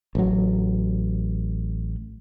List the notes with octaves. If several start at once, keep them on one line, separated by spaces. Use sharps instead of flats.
A1 F#3